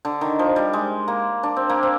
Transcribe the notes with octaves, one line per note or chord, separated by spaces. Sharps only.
D3
D#3
F3
G3
G#3
A#3
D4
C4
A#3
C4